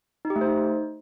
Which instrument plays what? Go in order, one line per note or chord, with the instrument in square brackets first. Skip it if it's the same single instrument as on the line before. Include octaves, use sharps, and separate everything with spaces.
[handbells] D#4
G4
A3
C5
D#4